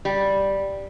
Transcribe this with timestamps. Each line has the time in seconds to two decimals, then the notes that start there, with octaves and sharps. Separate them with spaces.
0.05 G3